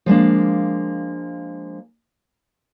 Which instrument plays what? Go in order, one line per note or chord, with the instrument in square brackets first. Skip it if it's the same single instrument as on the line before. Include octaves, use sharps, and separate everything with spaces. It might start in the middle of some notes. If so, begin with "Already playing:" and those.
[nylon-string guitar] F3 G#3 A#3 D4